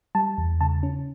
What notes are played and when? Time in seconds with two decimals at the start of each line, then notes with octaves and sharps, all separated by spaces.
0.15 G3 A5
0.38 E2
0.61 C#3 A5
0.83 C#4